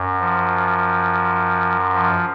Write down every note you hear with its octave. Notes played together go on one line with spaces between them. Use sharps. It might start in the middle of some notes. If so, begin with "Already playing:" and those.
Already playing: F#2
F3
F3